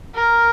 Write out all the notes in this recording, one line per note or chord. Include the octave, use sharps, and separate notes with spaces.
A#4